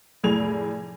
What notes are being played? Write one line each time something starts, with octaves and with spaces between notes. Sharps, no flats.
F1 A2 G#4 G#6 F7